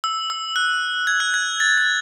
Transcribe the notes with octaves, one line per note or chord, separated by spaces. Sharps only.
E6
E6
F#6
G#6
F#6
G#6
A6
G#6